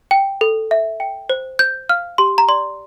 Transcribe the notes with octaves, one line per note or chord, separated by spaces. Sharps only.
G5
A4
E5
G5
C5
C5 G6
F5 F6
G4 C6
A#5
D5 C6